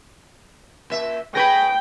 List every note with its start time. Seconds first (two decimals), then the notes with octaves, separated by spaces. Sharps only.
0.90 A#2 E5
1.35 G#4 B4 C#5 G5 B5 G6 A#6